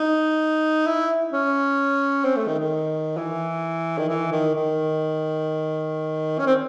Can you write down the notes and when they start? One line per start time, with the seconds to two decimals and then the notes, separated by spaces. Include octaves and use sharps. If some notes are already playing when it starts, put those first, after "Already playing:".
Already playing: D#4
0.86 E4
1.32 C#4
2.24 C4
2.36 A3
2.47 D#3
2.59 D#3
3.17 E3
3.98 D#3
4.08 E3
4.32 D#3
4.55 D#3
6.39 C#4
6.46 C4